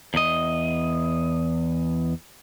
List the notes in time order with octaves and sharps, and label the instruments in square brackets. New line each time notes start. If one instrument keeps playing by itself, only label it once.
[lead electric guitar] E2 D#5